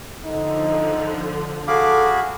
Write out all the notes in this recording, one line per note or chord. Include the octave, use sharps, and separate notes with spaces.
D3 F3 D#4
F#4 G#4 A4 F5 B5 D6